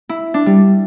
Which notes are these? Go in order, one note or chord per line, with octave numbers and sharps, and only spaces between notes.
E4
D4
G3